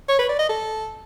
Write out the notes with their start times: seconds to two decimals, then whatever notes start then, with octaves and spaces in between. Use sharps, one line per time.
0.09 C#5
0.19 B4
0.29 D5
0.39 D#5
0.49 A4